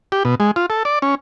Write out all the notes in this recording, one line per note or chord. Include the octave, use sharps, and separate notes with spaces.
G4
B2
G#3
F4
A4
D5
C#4